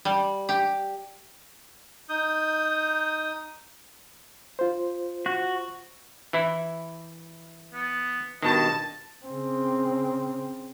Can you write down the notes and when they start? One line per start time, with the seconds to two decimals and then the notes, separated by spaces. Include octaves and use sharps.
0.05 G3
0.49 G4
2.09 D#4 D#6 G6
4.59 F4 C5
5.26 F#4
6.33 E3 E4
7.74 B3
8.42 G2 B2 D#3 D#5 A5
9.25 C#3 C4